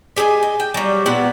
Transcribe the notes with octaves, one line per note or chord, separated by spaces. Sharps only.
G4 G#4 D#5 G#5
D#5
G5
F#3 G3
A#2 B3 G4 F#5